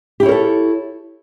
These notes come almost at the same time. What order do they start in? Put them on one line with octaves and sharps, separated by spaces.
G4 E4 C#5 A#4 A4